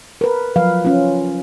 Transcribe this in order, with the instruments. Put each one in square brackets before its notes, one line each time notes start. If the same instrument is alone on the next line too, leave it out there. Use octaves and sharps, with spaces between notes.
[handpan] A#4 B4
F3 F#3 B4 F5
C#4 F4